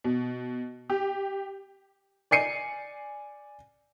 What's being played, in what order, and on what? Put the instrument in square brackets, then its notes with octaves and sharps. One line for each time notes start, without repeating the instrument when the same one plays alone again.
[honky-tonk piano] B2
G4
[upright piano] D5 G#5 C7 C#7 D#7